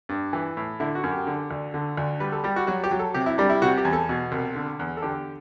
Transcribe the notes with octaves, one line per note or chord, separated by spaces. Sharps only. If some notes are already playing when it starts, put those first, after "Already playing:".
G2
E3
A2
D3 E4
F#4
F#2
G4
D3
D2
D3
D2
G3 B4
A4
G3 G4
F#4
F#3 F#4
G4
F#3
A4
C3 G4
E4
G3 D4
E4
C3 F#4
G4
E2
A4
B2
C2
D3
E2
A4
D3 G4